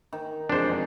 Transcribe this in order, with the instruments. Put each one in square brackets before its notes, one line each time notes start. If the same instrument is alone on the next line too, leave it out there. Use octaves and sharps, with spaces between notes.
[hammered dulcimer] D#3
[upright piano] E1 F2 G#3 [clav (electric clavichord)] D4 C5